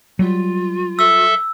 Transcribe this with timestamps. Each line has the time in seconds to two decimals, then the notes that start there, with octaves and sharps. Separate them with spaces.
0.19 F#3 G3 F4
0.99 A4 E5 E6